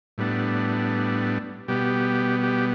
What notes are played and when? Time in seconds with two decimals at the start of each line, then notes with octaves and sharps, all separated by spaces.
0.18 A2 G3 B3 D4
1.68 B2 G3 B3 G4
2.43 G4